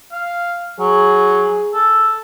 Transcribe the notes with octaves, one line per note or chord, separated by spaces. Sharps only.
F5
F#3 G#4
A4